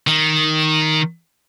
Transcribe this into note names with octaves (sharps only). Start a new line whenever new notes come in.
D#3